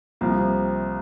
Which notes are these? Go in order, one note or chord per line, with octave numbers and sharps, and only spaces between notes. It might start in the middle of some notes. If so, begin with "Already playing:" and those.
C2 C3 F3 A#3
C4